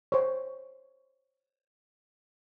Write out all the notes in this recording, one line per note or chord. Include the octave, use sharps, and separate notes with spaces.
C5 C#5